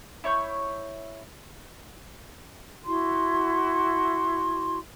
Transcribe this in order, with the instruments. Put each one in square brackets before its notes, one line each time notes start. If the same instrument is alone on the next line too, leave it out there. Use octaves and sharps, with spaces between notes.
[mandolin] E4 C#5 C#6 G6
[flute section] E4 F#4 C6